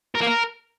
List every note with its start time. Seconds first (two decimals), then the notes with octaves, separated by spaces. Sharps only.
0.15 A#4
0.21 A#3
0.27 A#4